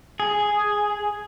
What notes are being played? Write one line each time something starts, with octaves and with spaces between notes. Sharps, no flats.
G#4